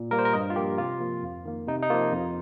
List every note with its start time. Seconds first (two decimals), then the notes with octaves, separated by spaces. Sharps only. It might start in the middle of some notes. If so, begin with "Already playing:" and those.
Already playing: A#2
0.11 G3 A#3 A#4
0.19 C5
0.25 A#4
0.33 G2 D#5
0.50 F4
0.56 F3 A#3 G4
0.78 C3 F4
1.00 F3 A#3
1.23 F2
1.45 D#3 A#3
1.67 C3 D#4
1.83 D#4
1.90 F3 A#3 F4
2.12 F2